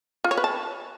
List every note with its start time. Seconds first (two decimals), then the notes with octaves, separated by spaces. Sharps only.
0.24 F4
0.31 C#5
0.37 B4
0.44 A5